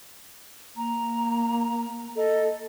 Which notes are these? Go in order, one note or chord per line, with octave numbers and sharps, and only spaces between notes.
A#3 A#5
A4 D#5